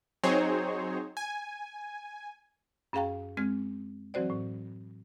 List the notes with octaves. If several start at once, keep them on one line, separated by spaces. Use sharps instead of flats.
F#3 C4 D#4 G#4 C5 C#5
G#5
F#2 C#4 G#4 F5 G5 A#5
G#3 C4 F6 G#6
E3 F#3 C4 F#4 C5 D5
A2